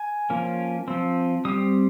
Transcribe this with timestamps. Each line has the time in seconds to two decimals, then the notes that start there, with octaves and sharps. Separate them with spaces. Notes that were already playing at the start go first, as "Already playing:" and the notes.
Already playing: G#5
0.30 F3 A#3 C#4
0.88 F3 C4
1.45 G3 C4 D#6